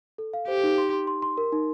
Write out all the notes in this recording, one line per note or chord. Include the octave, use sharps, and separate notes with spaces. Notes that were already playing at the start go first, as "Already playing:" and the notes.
A4
F5
G4 C5
D#4
C6
C6
C6
C6
A#4
D#4